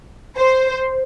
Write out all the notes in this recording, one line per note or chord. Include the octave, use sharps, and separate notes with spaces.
C5